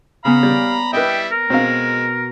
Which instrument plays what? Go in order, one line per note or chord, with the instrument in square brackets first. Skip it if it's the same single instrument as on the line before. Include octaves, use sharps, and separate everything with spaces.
[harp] C#3 B3 [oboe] F5 [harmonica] A#5 B5
[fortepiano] G3 [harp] D5
[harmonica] G3 E4 [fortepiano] B4 D#5 [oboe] G5
[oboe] A#4
[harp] B2 A#5 [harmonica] G#3 [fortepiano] C4 F5